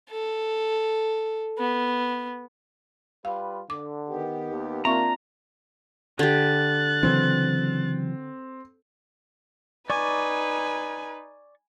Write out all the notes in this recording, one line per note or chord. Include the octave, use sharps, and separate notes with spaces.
A4
B3
G3 F4 B4 F5
D3 D6
D#3 B3 G4
D#2
A#3 C4 D4 F4 E5 A#5 C#6
D3 G4 F#6 A6
C#3 E3 F#3 C4
D#4 B4 D5 G#5 C#6 D6